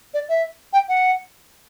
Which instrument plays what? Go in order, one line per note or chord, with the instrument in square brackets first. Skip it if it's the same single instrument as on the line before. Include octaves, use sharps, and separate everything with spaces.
[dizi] D5
E5
G5
F#5